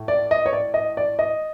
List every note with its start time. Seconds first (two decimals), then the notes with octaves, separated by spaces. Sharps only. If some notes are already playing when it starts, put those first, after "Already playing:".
Already playing: A2
0.08 D5
0.31 D#5
0.46 C#5
0.53 D5
0.74 D#5
0.97 D5
1.19 D#5